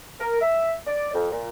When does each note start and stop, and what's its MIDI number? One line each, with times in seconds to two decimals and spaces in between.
0.20 0.39 70
0.41 0.74 76
0.87 1.10 74
1.14 1.28 41
1.32 1.49 46